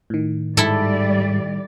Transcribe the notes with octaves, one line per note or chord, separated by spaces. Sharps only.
A2 D#3
G#2 G3 E4 A4 D5